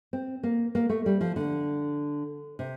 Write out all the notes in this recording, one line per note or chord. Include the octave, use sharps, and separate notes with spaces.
C4
A#3
A#3
A3
G3
F3
D3
C3